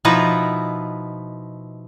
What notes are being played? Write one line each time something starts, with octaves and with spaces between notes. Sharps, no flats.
B2 F3 D#4 E4 B4 A#5